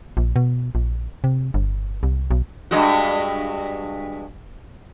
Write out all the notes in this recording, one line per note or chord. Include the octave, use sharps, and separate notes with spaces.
A#1
B2
A#1
C3
G1
C2
B1
G2 G#3 F#4